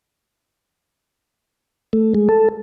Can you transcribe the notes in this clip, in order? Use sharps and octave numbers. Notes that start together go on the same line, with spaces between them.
A3
G#3
A4